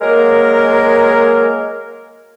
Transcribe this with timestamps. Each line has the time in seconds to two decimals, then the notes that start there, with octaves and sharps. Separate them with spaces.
0.01 F#3 G#3 A#3 A#4